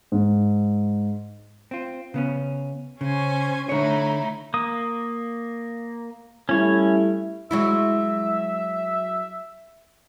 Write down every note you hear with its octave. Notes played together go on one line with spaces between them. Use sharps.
G#2
C4 F4
C#3 B3 C#4
C#3 C#4 C5 G#5
D3 A3 D#4 E4 C#5
A#3 D#6
G3 A3 C#4 E4 C#5 G#5
F#3 G#3 E4 E5